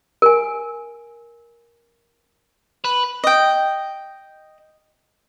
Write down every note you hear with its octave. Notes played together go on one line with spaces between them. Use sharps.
A#4 G#5
B4
D#5 G5